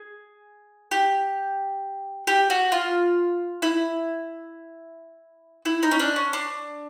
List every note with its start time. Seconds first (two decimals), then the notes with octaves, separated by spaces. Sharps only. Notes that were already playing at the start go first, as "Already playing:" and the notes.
Already playing: G#4
0.91 G4
2.27 G4
2.50 F#4
2.72 F4
3.62 E4
5.65 E4
5.83 D#4
5.91 C#4
5.99 D4
6.16 C#4
6.33 D4